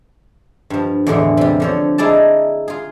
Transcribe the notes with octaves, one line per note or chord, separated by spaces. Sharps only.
G2 F3
E2 A2 D3 E3
C3 G3
D3 F3 C#5
D#4 E4 G#4 D5 A5
F4 G#4